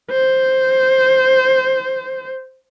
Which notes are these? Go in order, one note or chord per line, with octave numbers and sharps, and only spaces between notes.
C5